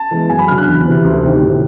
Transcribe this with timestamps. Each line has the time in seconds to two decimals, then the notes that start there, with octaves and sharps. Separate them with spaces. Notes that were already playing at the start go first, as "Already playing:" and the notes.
Already playing: A5
0.11 E3 G#3 B3
0.29 F#2 G#5
0.39 B5
0.48 D3 F#3 F6
0.58 F#6
0.67 E2
0.86 C3 E3
1.05 D2
1.23 C3 D#3
1.42 A2